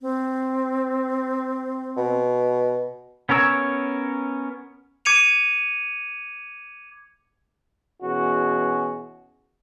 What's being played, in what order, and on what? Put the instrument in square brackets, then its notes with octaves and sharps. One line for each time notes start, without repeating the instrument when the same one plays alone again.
[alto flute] C4
[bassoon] B2
[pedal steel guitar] B3 C#4 A#4 C#5 E6
[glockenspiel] D6 G#6 C#7 D#7 F7
[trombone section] B2 E3 C#4 F#4 G#4